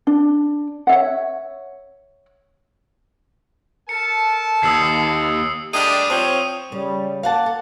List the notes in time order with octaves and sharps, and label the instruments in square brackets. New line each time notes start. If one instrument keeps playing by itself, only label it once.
[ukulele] D4
C#5 E5 F#5
[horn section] A4 A#4 A5 [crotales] C#7
[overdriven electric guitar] D#2 [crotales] D#6 E6 C7
[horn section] G3 A3 D4 [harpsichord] G#4 D#5 G5 [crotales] D#6 D#7
[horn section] F3 C5 C#5 [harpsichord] C4
[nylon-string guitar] C#3 [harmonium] G3
[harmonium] A#3 [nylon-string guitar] F5 F#5 A5
[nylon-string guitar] A4